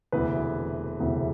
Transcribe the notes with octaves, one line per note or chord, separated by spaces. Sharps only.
E1 D2 C3 E3 B4
E1 D2 C3 E3